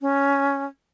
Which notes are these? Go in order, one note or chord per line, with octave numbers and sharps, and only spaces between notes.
C#4